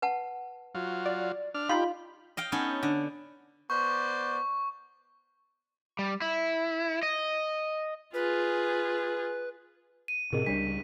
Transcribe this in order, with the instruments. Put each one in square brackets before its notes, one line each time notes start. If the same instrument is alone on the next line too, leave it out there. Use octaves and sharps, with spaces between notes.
[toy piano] B4 F#5 A5
[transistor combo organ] F#3 F4
[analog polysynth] D5
[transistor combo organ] D4 F6
[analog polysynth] D#4 F4 B5 [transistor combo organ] G4 [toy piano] F5 C6
[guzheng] D#5 F5 G5
B3 C#4 D#4 A4
D3
[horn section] B3 C5 D5 [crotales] C#6
[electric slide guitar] G3
E4
D#5
[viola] F4 G#4 [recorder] B4
[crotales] D#7
[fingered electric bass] A2 C3 C4 [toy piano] G#4 A#4 D#5
[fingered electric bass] C#2 G3 [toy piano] D4 G4 C#5 [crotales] B6